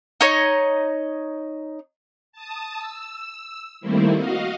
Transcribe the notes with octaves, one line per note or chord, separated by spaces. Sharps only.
D#4 C#5 D#5
A5 D#6
E6
D#3 G3 A3 A#3 C4 E4
F#4 D#5 F5